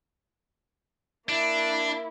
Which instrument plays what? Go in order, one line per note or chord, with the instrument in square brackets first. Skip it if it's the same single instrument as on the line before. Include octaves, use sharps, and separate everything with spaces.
[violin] A#3 E4 [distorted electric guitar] D4